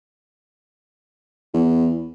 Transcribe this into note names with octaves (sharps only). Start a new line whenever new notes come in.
E2